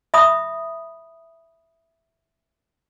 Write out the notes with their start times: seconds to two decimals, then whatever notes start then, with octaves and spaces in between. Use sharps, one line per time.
0.14 E5 B5 D#6